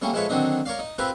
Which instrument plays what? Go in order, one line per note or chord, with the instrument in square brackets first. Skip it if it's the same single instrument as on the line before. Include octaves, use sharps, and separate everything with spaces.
[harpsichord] G3 A3 A#3 C#4 G4
F3 G#3 E4 A4 B4 C#5
D3 D#3 F#3 C4 D4 D#4
A#4 C#5 D5 F5
D#4
C4 E4 F4 G4 A#4 B4